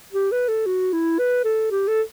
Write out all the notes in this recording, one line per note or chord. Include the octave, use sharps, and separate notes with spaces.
G4
B4
A4
F#4
E4
B4
A4
G4
A4